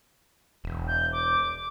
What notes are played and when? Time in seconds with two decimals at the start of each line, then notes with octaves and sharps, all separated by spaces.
0.64 E1
0.87 G6
1.12 D6